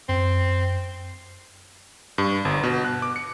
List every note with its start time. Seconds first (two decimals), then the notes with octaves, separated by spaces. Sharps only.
0.09 F#2 C4
2.18 G2
2.45 G1
2.63 B2
2.85 F#6
3.02 D6
3.16 C#7